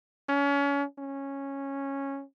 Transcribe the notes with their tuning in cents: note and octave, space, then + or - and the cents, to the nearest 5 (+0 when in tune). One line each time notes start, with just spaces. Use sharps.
C#4 +30
C#4 -10